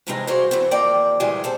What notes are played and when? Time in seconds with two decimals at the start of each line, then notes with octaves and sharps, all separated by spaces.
0.07 A2 C3 E3 G3 G#3 D#4
0.27 F#4 G#4 C5 D5 F5 F#5
0.51 E3 B3 C4
0.71 D#2 F3 A#3 D5 G5
1.20 A#2 D#3 E3 G3 G#3 G#4
1.44 C4 A4 C5